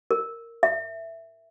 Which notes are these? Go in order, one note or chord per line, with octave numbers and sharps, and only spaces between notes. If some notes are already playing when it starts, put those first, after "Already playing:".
A#4
E5